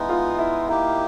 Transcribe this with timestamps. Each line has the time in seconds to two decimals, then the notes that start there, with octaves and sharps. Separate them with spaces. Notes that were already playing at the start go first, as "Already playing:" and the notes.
Already playing: G#3 B3 D#4 E4
0.09 F4
0.38 E4
0.68 A#3 D#4 E4 G4